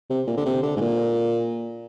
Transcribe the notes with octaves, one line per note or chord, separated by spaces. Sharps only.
C3
A#2
D3
C3
D3
G#2
A#2